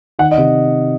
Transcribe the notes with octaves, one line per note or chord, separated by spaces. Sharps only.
D#3 F#5
D#5
C3